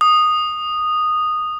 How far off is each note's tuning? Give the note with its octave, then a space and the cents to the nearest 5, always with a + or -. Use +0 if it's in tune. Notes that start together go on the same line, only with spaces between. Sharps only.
D#6 -10